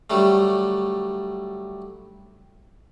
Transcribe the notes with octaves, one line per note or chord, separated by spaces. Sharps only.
D3 F#3 G3 A3